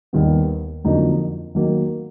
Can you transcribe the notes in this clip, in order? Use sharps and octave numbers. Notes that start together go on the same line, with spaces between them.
D#2 D#3 G3 B3
F2 D3 F#3 A#3 D#4
D#3 F#3 A#3